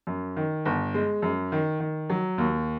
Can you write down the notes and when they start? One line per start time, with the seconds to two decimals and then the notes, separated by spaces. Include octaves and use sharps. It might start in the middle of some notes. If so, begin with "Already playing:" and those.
0.07 F#2
0.36 D#3
0.65 G1
0.94 G#3
1.22 F#2
1.52 D#3
1.80 D#3
2.10 F#3
2.38 D#2